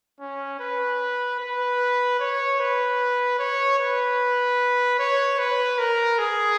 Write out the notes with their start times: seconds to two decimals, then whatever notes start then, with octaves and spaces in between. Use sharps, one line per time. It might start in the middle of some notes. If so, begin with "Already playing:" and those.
0.20 C#4
0.60 B4
1.40 B4
2.20 C#5
2.60 B4
3.39 C#5
3.79 B4
4.99 C#5
5.39 B4
5.79 A#4
6.19 G#4